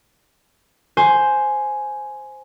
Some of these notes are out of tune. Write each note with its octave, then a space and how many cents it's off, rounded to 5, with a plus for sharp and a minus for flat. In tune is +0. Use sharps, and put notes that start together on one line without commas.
C5 +0 G#5 +10